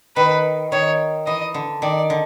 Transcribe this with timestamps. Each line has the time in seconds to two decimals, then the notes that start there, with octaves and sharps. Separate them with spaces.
0.16 D#3 B4
0.72 D#3 C#5
1.26 E3 D#5
1.54 D3
1.82 D#3 D5
2.10 D3